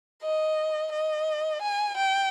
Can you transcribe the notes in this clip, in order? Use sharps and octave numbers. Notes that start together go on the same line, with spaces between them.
D#5
D#5
G#5
G5